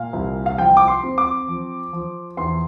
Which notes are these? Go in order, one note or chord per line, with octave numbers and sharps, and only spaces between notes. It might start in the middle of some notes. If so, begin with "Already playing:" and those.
Already playing: A#2 F5
C2
F5
F3 G5
D6
C6
C4
D6
F3
F3
E2 C6